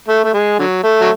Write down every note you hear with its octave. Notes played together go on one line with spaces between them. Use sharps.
A3
A3
G#3
D3 F#3
A3
F#3